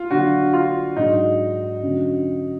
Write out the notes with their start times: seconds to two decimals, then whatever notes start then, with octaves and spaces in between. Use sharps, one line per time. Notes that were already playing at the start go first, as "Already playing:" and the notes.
Already playing: F4
0.10 D3 F#3 D4 F#4
0.53 F4
0.96 G#2 F#3 D4 D#4
1.83 F#2 D3 F#3